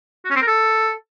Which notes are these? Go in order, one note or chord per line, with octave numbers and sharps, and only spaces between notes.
F#4
C#4
C4
A#4
A4